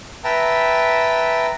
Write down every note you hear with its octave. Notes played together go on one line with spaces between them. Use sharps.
B4 E5 G5 A5 A#5